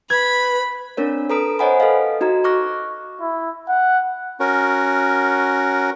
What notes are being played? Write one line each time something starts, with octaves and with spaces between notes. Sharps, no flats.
B4 B5 G#6
C4 D4 A#4 C#5
A4 B4 A#5 D#6 B6 D7
C5 C#5 D#5 F#5 G#5 B5
A4 B4 D#5 F5
D#4 F#4 D#5 A#5
C#6 D6 F6 F#6 A#6
E4
F#5
C#4 F#4 A#4